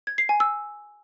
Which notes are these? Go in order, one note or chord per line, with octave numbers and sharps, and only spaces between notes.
G#6
C7
G#5
E6